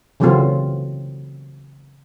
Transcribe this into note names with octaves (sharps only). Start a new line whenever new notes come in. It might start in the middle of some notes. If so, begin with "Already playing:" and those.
C#3 E3 F#3 A3 C4 F4